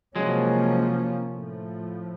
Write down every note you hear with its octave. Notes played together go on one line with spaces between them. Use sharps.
C3 F3 F#3 G#3 A#3 C#4
A2 F3 A3